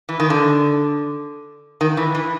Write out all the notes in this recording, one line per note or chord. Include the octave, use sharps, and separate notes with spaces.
E3
D#3
D3
D#3
E3
E3